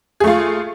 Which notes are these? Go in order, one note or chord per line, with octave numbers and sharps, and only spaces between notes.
A3 F4 G#4